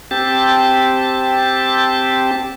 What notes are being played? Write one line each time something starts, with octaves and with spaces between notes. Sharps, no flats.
C4 G4 A5